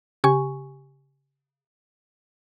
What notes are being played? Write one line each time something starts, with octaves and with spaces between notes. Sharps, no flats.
C#3 G4 G#5 C#6